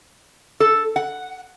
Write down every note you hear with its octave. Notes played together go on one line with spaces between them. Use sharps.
A4
F#5